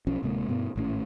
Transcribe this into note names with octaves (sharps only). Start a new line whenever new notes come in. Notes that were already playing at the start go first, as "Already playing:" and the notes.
B1 F3 C#4
D1 C3 G#3 A#3
G2 B2 B3
G#1 A2 C#4